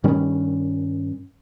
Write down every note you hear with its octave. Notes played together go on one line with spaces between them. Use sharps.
G2 D#3 G3 C#4